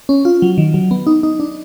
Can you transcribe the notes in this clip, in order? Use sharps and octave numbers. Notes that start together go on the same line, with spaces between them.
C#4
F4
F#3
D#3
F#3
B3
D#4
D#4
D4